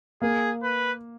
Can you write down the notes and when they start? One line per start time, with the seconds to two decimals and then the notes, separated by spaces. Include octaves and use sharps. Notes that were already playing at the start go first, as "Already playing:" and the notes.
0.22 A#3 G#4
0.63 B4